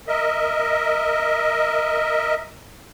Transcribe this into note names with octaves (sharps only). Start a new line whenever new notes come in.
A#4 D#5 E5